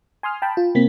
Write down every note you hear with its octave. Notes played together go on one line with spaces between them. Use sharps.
G#5 C6 D#6 F6
G5 A5 B5
F4
C3 A#3 C4 B6